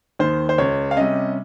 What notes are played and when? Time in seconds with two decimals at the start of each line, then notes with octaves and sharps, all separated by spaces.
0.19 D#2 D#3 C5
0.49 C5
0.58 C#2 C#5
0.91 F5
0.97 C3 G3 C#4 D#5